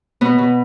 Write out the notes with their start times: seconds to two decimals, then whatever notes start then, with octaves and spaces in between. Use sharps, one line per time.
0.21 B2 B3
0.38 B2